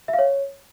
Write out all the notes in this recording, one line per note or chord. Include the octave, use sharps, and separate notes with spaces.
E5
F5
C#5